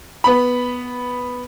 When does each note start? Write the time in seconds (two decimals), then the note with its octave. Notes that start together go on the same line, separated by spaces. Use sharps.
0.24 B3 B5